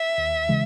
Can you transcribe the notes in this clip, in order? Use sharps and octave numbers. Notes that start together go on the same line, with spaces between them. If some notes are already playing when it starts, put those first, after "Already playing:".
Already playing: E5
D#2
C#3 E3 G#3